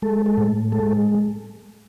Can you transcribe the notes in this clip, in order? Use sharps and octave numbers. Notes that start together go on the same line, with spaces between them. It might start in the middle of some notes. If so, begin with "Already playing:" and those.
G#3 A4
A4
A2
G#3 A4